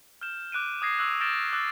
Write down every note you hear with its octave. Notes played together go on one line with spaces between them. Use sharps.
F6 G6 E7
D6 F#6 D7 D#7
D6 D#6 G6 G#6 A#6 C7
C#6 E6 F#6
F6 G6 A6 A#6 D7 E7
D6 E6 F#6 A6